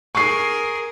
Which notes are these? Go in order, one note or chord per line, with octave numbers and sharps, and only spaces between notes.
G#4 A#4 C#6 C7